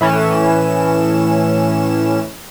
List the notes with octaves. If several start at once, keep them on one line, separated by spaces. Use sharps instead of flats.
A2 E3 C#4 E7